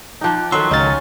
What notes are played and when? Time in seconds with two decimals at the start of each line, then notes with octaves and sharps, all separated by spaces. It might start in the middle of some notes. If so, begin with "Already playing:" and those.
0.21 F3 D#4 G5 D6 F#6
0.52 D#3 F#3 A4 E5 C6 F#6
0.71 C#2 C#4 D#4 F5 F6 A6